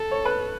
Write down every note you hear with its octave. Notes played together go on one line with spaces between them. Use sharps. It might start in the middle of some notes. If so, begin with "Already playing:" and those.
Already playing: A4
C#5
B4